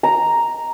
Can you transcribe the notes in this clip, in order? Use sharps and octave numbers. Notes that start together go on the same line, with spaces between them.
A#5